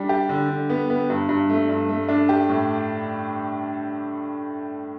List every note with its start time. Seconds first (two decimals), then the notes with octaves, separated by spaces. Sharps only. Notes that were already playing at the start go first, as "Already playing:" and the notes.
Already playing: G3 D4
0.09 G4
0.29 D3
0.49 D3
0.69 B3
0.90 B3
1.10 G2
1.29 G2
1.50 A3
1.69 G2
1.89 A3
2.09 D4
2.29 G4
2.49 A2